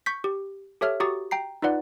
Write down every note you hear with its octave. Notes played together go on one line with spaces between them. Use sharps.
C#6 G6 B6
G4
G4 A4 C#5 E5 F6
F#4 G4 A#5 C#6 D#6 A6
G5 A#5 C7
D#4 F4 B4 D5 F#5